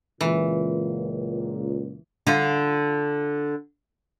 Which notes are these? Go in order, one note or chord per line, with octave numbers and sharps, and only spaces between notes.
C#2 A#2 E3
D3 F4